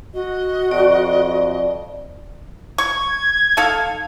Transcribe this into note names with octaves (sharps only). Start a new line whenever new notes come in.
F#4 D#5
F2 D5
C#6 G#6
D#4 A4 F5